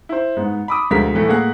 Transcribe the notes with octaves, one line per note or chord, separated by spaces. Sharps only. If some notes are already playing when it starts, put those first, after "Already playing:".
E4 C5
G#2 B3
B5 D6 D#6
D2 B2 F3 G#3 A#4 B6
A2 E3 A3 B3
A2 A#3 G#4 F#5 F#6